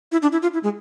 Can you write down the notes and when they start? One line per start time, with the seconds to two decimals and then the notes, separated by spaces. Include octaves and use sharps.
0.12 E4
0.22 D4
0.32 E4
0.42 F4
0.53 E4
0.63 G#3